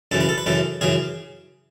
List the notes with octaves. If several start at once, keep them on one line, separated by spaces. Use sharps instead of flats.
F#2 C#3 E3 A4
B4
A4
B4
F#2 C#3 E3 A4
F#2 C#3 E3 G#4